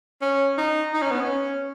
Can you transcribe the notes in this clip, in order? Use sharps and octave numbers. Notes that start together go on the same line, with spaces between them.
C#4
D#4
D#4
C#4
B3
C#4